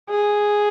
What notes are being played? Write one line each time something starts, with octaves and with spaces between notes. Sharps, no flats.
G#4